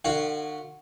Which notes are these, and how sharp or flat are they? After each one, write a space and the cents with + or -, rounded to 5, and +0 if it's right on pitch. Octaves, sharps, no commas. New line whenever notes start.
D3 +45 F#4 +0 F5 +0